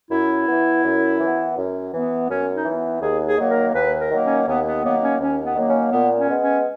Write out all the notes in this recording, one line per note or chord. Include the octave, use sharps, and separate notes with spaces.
F#2 E4
B3
E3
F#2
E3 B3
F#2
E3 B3
F#2 C#4
D#4
E3 B3
D#2 G#4
G#4
D#3 F#3 A#3
A#4
D#2 B4
A#4
D#3 F#3 A#3
C#4
D#2 B3
B3
D#3 F#3 A#3 B3
C#4
D#2 C#4
B3
D#3 F#3 A#3
C#4
A#2 B3
C#4
G#3 B3
C#4